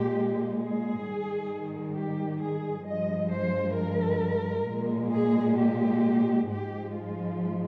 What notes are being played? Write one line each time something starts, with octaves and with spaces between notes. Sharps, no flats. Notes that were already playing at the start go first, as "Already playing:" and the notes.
Already playing: A#2 G#3 G4
G#4
G#2 D#3 G3
G4
G#4
G2 F3 G#3 D#5
C5
A#4
A#2 G#3
G#4
G4
G#2 F3 G#3 G4
F4